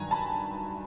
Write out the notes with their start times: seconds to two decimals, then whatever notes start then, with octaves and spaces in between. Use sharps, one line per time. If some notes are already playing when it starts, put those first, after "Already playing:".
Already playing: G2 D#3 F#3 G#5 A#5
0.11 A5 B5